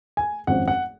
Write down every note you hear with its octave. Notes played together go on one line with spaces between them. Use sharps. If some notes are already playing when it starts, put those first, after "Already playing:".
G#5
G#1 F#2 F3 F#5
F#5